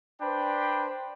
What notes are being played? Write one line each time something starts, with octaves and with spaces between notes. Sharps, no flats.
D4 B4 C5 G5 B5